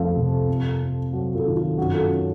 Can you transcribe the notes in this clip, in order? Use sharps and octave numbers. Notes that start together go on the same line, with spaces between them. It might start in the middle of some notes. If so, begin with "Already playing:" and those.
Already playing: F2 F3 A3 F4 A4
C3
F2
C4
F#3 F#4
F4 A4
D#3
F4
F#2 F#4
F4 A4
C#4